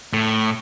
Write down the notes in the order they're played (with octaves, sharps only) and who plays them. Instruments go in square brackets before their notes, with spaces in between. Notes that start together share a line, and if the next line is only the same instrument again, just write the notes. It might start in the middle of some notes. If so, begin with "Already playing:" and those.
[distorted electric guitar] A2